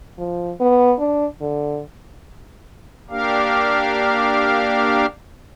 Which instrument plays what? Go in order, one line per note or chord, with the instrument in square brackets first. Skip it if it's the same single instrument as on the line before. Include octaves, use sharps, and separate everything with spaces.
[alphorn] F3
B3
D4
D3
[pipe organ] A#3 D4 G4 A#4 F5